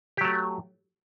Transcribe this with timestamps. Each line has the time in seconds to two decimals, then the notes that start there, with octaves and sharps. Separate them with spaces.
0.17 G4
0.21 F#3
0.25 A3